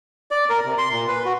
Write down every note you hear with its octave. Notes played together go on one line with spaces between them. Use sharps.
D5
A#4
C3
C6
A#2
B4
F#4